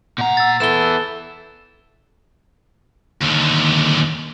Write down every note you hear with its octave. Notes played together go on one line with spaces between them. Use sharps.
A#2 F#5 A#5
E6 A6
B3 E4 A4 E7 G7
D#2 D3